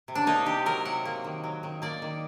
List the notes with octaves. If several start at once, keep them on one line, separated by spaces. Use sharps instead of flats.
C3
D4
A#3 D#4
C3 G4
F#3 A#4
C3 F#5
A#3
D#3
F#3
D#3
A#3 D5
D#3